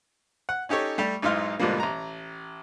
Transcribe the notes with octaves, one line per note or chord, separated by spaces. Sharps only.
F#5
C#4 D#4 G4 A4 C#5
G3 A3 G4
B1 G#2 D#4 E4 F5 C6
G#2 B2 D3 F3 G3 A#3
A1 A#5